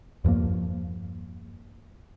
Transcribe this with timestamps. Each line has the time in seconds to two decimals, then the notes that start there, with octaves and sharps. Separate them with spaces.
0.24 E2 G2 F3 A#3